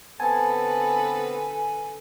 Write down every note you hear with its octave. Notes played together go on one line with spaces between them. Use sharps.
D3 B3 C4 A4 B4 G#5 A5